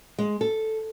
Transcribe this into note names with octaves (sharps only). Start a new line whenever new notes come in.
G#3
A4